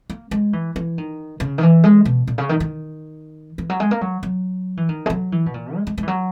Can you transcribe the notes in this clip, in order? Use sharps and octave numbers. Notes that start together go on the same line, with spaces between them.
A#3
G#3
E3
E3
D#3
C#3
D#3
E3
G#3
B2
A#2
C#3
D#3
D#3
E3
F#3
G#3
A#3
F#3
F#3
E3
D#3
G#3
F#3
E3
B2
A#2
G#3
G#3
G#3
E3
F#3